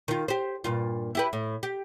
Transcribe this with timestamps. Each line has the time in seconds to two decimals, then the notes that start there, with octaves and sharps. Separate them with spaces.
0.08 D#3 F4
0.28 G4 C5
0.64 G2 A#2 F4
1.15 E4 G4 B4
1.33 A2
1.63 G4